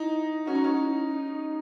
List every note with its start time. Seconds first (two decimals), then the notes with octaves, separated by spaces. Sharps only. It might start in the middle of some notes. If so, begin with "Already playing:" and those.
Already playing: D#4 E4
0.46 C#4 F#4
0.55 D#4
0.64 C#4
0.79 E4
1.11 D#4